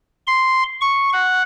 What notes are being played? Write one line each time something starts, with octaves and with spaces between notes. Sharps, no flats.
C6
C#6
F#5